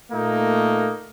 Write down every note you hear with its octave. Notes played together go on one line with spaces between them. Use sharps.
A#2 A3 A#3 D#4